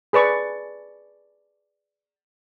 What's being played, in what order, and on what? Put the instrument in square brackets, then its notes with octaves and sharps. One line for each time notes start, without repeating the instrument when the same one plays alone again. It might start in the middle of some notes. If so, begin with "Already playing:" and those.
[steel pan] G#4 B4 D5 C#6